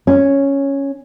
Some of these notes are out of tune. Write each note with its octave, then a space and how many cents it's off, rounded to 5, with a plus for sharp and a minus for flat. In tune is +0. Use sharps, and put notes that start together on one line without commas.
C#4 -5